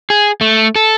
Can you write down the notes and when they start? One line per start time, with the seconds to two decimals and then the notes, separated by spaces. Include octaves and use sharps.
0.10 G#4
0.41 A3
0.76 A4